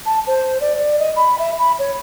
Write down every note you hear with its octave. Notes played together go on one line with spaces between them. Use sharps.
A5
C5
D5
D5
D#5
B5
E5
B5
C#5